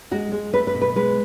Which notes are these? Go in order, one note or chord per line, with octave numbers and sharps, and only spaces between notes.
G#3 F#4
G#3
A3 B4
B4
B2
B4
G#3 B4